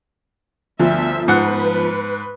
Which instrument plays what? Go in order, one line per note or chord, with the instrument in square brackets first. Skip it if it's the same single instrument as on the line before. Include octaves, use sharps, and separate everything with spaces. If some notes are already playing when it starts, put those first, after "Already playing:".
[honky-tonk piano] G1 F3 [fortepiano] D2 [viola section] E5
[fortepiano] G#2 F#5 F#6 [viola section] B4